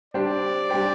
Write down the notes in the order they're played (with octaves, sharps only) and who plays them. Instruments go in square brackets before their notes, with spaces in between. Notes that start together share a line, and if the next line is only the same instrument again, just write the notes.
[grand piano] G3 D4 G4 C5 [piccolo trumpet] D5
[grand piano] G3 D4 G4 C5